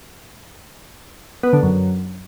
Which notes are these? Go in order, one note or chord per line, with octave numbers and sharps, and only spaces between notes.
B3
D3
F#2